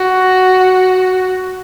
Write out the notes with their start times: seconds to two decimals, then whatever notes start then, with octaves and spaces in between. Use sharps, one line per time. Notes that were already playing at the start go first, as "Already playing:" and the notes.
Already playing: F#4